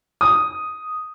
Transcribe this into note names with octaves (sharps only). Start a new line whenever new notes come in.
D#6